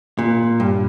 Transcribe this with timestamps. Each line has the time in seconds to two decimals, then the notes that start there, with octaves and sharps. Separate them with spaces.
0.19 A#2
0.60 G2